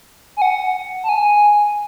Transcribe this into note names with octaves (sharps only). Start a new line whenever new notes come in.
G#5
F#5
A5
G#5